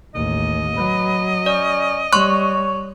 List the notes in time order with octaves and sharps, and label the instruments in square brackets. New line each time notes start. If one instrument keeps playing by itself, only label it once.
[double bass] A1 D#2 [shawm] D#5
[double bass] F#3 [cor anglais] B4
[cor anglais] C#4 [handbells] D5
[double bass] G3 [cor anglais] C#5 [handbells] C6 C#6 F#6